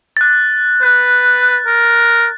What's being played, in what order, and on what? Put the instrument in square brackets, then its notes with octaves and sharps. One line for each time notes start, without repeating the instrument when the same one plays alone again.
[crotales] F#6 A6
[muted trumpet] B4
A#4